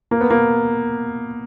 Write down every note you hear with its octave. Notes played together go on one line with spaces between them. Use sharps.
A#3
B3
A#3